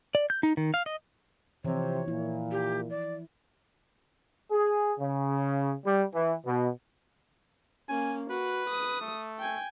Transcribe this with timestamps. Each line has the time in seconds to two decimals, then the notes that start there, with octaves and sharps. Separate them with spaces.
0.15 D5
0.30 G6
0.43 D#4
0.57 D#3
0.74 F5
0.86 D#5
1.65 C3 E3 F3 C4 C#5
2.08 A#2 E4
2.51 G4
2.90 D5
4.51 G#4
4.99 C#3
5.84 G3
6.13 E3
6.45 B2
7.89 A#3 C#4 G#5
8.30 F#4 B4
8.69 D#6
9.01 A3
9.39 G5 G#5